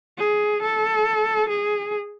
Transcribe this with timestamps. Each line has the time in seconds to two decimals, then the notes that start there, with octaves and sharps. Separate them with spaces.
0.18 G#4
0.62 A4
1.49 G#4